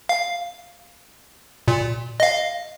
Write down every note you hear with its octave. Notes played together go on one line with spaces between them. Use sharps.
F5
A#2
D#5 F5